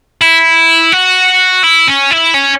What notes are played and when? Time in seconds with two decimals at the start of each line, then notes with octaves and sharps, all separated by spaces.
0.21 E4
0.93 F#4
1.64 E4
1.88 C#4
2.11 E4
2.34 C#4